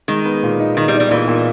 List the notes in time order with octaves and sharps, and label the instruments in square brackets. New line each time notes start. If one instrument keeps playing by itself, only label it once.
[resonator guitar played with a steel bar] D#3 [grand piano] G#3
[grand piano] B3
A#2
D#4
[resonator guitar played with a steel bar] D#3 [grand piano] D#4
[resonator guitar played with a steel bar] G3
[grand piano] D#4
[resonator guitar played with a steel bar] G3
[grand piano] A#2 [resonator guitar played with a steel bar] E3
[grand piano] A#2